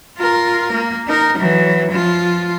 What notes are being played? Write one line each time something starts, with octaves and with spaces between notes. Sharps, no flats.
F4 A#4
A#3
D#4 A#4
E3 F#3
F3 F4